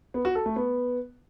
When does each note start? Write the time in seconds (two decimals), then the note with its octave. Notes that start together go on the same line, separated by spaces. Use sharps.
0.14 B3
0.25 F#4
0.35 A4
0.46 A3
0.56 B3